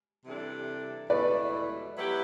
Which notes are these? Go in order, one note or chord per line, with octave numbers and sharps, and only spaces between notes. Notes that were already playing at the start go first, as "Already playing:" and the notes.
C3 E3 G3 D4 A4
E2 B2 A3 E4 B4 D5
F#3 B3 E4 G4